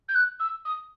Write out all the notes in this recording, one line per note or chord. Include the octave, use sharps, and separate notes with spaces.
G6
F#6
E6
D#6